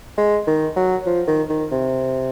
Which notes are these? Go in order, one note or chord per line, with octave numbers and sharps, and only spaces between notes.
G#3
D#3
F#3
F3
D#3
D#3
C3